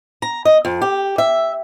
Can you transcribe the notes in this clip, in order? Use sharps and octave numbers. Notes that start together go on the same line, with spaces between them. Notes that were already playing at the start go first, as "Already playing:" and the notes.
A#5
D#5
F2
G4
E5